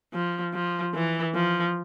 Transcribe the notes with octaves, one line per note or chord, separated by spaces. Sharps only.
F3
F3
E3
F3